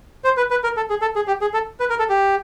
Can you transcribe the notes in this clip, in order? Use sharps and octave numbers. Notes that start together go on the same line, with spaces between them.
C5
B4
B4
A#4
A4
G#4
A4
G#4
G4
G#4
A4
B4
A#4
A4
G4